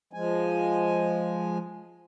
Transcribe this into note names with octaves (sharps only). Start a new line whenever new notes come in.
F3 G#3 G#5